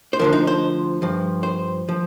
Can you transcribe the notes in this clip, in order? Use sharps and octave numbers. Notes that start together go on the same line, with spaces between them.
C5
D2 D3 F3 A#4
D#4
C5
G2 F3
C5
F3